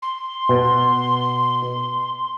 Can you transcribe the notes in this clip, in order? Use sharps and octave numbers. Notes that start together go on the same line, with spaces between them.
C6
B2